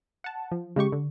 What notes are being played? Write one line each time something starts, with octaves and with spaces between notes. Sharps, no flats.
F#5 A5
F3
C#3 G#3 G4 C#6
D3